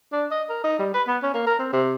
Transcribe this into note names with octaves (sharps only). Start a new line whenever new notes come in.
D4
D#5
A#4
D#4
G3
B4
B3
C#4
A#3
A#4
C4
C3